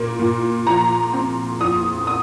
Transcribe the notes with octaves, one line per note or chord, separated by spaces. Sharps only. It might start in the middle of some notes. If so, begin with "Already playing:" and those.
Already playing: A#2 A#3
A#2
F3 A#5
C4
F2 D#6
D#6